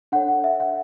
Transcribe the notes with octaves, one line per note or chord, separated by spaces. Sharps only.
D4 A4 C#5 F#5
F#5
E5
F#5